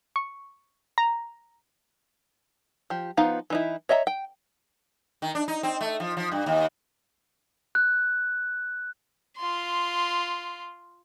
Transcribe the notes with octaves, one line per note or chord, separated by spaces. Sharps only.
C#6
A#5
F3 G4
F3 B3 D#4 F5
E3 D#4 E4
C#5 D#5 E5 G#5 A#5
G5
D#3
D4
D#4
C4
A3
F3
F3
G2
D#2
F#6
F4 C6